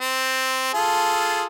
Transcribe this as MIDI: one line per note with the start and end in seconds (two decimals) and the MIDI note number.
0.01 0.70 60
0.74 1.44 65
0.74 1.44 68
0.74 1.44 69